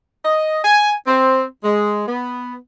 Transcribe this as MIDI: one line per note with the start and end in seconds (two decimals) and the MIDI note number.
0.24 0.59 75
0.64 0.93 80
1.07 1.43 60
1.64 2.04 56
2.08 2.55 59